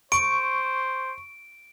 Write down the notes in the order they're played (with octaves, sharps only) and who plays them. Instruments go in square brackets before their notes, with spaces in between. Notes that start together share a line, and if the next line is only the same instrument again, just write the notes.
[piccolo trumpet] C5 [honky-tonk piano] C#6 [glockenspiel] D7